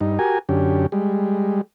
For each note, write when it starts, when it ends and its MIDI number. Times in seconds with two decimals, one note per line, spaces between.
0.01 0.19 43
0.01 0.19 63
0.19 0.39 66
0.19 0.39 67
0.19 0.39 70
0.19 0.39 80
0.49 0.86 42
0.49 0.86 50
0.49 0.86 61
0.49 0.86 67
0.92 1.61 55
0.92 1.61 56